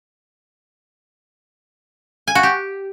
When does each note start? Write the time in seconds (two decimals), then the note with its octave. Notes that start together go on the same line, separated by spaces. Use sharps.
2.28 G#5
2.35 F#4
2.43 G4